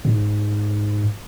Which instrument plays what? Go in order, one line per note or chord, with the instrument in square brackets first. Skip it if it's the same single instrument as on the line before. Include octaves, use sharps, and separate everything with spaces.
[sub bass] G#2